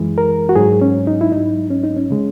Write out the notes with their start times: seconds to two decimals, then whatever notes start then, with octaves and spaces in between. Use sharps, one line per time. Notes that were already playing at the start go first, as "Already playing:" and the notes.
Already playing: F#2 E3 G#3
0.18 A#4
0.49 F#4
0.56 G#2 F#3 G#4
0.82 C#4
1.07 D#4
1.21 E4
1.32 G#2 F#3 D#4
1.70 C#4
1.84 D#4
1.96 C#4
2.10 C#3 G#3